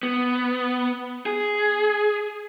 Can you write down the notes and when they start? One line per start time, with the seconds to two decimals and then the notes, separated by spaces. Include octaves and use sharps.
0.03 B3
1.26 G#4